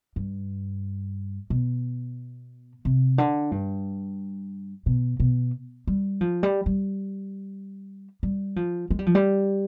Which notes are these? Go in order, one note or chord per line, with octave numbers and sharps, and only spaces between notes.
G2
B2
C3
D3
G2
B2
B2
G3
F3
G3
G3
G3
F3
G#3
G3
F3
G3